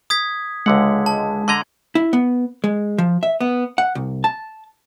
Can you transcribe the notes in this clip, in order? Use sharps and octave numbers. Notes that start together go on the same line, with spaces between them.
D#6 G#6 B6
C#2 D3 G#3 F#5
A5
D3 D#5 A#5 C6 G#6
E4
B3
G#3
F3
E5
B3
F#5
C2
A5